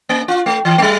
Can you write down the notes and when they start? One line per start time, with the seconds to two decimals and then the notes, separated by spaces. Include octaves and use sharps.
0.09 A#3
0.28 F4
0.46 A3
0.65 E3
0.78 A3
0.82 G3